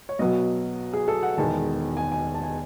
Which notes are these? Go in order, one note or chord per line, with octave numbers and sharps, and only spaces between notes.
C#5
B1 B2 F#3 B3 D#5
G#4
A4
F#5
E1 E2 D#3 G#3 A5
G#5
G#5
A5
G#5